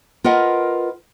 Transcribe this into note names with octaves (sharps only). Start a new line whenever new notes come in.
F4 A#4 B4 D#5 F#5